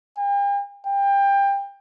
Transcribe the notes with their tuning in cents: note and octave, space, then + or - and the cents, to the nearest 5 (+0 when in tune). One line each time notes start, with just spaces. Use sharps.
G5 +45
G5 +25